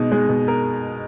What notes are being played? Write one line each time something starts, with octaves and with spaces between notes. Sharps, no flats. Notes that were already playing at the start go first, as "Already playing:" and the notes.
Already playing: B2 G#3 D#4
G#3
B2
A#4